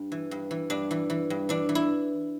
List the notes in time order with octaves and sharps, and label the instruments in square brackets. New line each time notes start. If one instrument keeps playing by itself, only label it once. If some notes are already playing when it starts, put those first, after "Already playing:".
Already playing: [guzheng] G2
E3
G2
E3
G2 D4
E3
E3
G2
E3 D4
E3
E4